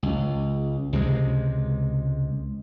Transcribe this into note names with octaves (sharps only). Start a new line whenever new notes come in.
C#2
C#2 C3 G#3